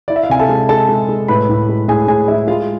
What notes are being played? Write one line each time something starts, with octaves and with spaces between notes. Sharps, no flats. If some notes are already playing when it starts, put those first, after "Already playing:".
E4 D5
E5
F5
C3 G#5
A4 A5
G#3
G#3 A4 A5
G#3
G#3
A2 B4 B5
A2
G#3
A2 G#4 G#5
A2 G#4 G#5
G#3 E4 E5
G#3 F4 F5